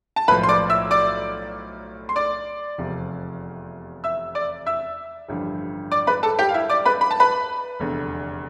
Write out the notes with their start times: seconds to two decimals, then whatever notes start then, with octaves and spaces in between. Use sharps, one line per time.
0.16 A5
0.28 B1 A2 F3 B4 B5
0.43 C6
0.49 D5 D6
0.69 E5 E6
0.91 D5 D6
2.09 C6
2.16 D5 D6
2.78 F1 E2 C3 F3
4.04 E5 E6
4.35 D5 D6
4.66 E5 E6
5.29 A1 G2 D3 F3
5.91 D5 D6
6.07 B4 B5
6.23 A4 A5
6.39 G4 G5
6.49 F5
6.54 E4 E5
6.70 D5 D6
6.85 B4 B5
7.01 B5
7.11 A5
7.20 B4 B5
7.80 F1 E2 D3